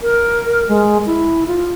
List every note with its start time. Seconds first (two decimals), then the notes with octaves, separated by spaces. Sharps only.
0.01 A#4
0.69 G#3
1.06 E4
1.47 F4